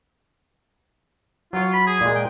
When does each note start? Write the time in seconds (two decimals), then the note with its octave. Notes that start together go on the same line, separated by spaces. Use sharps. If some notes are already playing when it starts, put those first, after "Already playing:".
1.53 F#3 F4 C#5
1.73 B5
1.87 G#4
2.01 A#2 G#3
2.15 G5